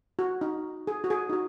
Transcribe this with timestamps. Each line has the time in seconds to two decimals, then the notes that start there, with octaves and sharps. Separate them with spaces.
0.19 F#4
0.41 D#4
0.87 G#4
1.04 F#4
1.10 G#4
1.29 D#4
1.33 F#4